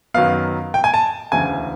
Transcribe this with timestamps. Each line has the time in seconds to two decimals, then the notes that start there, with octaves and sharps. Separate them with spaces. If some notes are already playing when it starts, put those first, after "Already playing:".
0.14 F#2 D#3 F#3 B3 F5
0.74 G5
0.84 G#5
0.94 A5
1.32 E1 D2 C#3 E3 G#5